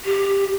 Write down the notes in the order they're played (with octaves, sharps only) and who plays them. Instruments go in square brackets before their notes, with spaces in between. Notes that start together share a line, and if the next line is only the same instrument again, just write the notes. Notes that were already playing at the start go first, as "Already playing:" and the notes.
[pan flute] G4